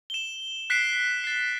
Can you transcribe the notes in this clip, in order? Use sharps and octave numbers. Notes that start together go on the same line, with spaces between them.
E7 G7
F#6 B6 C7 D7 E7
A6 C7